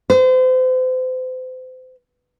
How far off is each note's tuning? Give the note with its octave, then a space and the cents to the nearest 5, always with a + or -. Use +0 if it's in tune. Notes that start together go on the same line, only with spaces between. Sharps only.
C5 -35